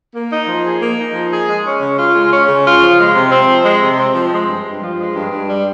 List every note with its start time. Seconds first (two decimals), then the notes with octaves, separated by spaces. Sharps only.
0.14 A#3
0.31 D#4
0.48 F3
0.64 G#4
0.82 A#3
0.98 D#4
1.14 F3
1.31 G#4
1.48 G#3
1.64 C#4
1.81 C#3
1.98 F4
2.15 G#3
2.31 C#4
2.49 C#3
2.65 F4
2.81 F3
2.97 G#3
3.15 C3
3.31 C4
3.47 F3
3.64 G#3
3.82 C3
3.99 C4
4.14 F3
4.32 G#3
4.48 G2
4.65 G2
4.81 F3
4.98 G#3
5.15 G2
5.32 G2
5.48 G3